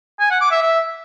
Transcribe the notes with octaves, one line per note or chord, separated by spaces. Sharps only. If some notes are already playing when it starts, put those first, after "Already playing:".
G#5
F#5
D6
E5
E5